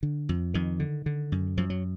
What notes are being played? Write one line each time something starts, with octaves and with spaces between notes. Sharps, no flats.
D3
F2
F2 D#3
D3
D3
F#2
F#2 F3
F#3